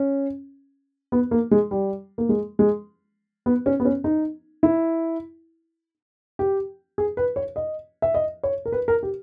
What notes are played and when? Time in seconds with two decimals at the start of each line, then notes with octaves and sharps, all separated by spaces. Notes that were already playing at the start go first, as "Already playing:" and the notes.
Already playing: C#4
1.12 B3
1.31 A#3
1.51 G#3
1.71 G3
2.18 A#3
2.29 G#3
2.59 G#3
3.46 B3
3.66 C#4
3.80 B3
3.85 C#4
4.04 D#4
4.63 E4
6.39 G4
6.98 G#4
7.17 B4
7.36 C#5
7.56 D#5
8.02 E5
8.14 D#5
8.43 C#5
8.66 A#4
8.72 B4
8.88 A#4
9.03 G4